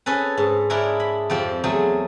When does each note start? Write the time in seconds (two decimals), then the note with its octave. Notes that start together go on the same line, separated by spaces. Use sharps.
0.06 C#4 G#4 A4 B4
0.37 G#2
0.70 D4 E4 G#4 A#4 C#5
1.00 B5
1.30 F2 F3 C4 G4
1.64 E2 F#3 A3 G#4 C5